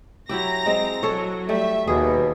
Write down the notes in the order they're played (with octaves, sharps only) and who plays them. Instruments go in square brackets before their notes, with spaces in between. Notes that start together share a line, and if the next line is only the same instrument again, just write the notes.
[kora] F#3 E4 G4 [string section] A#5 A#6
[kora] G#3 C4
[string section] F#3 [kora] A4 C#5
[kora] G3 A3 [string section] E5
[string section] D#2 [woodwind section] B2 [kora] G#4